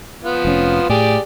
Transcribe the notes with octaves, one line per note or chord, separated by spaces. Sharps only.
F3 B3 F4
F1 C#4
A2 G4 G#4 D5